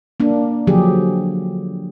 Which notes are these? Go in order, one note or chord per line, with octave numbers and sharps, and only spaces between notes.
A#3 D4
D3 F3 F#3 G4 G#4